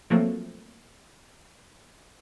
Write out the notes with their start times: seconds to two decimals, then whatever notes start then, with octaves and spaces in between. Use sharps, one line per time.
0.10 F3 F#3 A3 A#3 C4